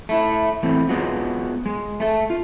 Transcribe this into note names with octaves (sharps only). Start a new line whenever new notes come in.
A3 E4
E3 A3 B3 C4
G#3 B3 F4 F#4
G#3
A3 A4
F4